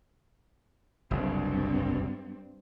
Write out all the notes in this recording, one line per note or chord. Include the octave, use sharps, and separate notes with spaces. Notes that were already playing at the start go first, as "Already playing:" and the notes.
F#1 C2 G2 F#3 C4